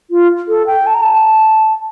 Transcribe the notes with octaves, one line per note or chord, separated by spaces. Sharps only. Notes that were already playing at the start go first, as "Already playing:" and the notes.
F4
A4
G5
A5
A#5
A5